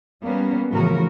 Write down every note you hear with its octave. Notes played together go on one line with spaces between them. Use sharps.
G3 A#3 B3 C#4
A2 C#3 E3 F3 F#4 A#4